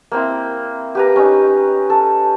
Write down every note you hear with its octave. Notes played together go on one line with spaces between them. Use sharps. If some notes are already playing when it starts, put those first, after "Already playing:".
A#3 C4 E4
G4 B4 A#5
C#4 D#4
A4